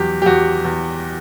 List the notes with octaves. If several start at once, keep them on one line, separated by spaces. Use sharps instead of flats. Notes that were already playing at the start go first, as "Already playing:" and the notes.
Already playing: E2 F#3 G4
G4
E2 F#4
E2